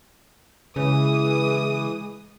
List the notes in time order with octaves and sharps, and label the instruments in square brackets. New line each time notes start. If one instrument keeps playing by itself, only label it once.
[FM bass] C#3 [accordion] E3 [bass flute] G#3 [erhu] D#6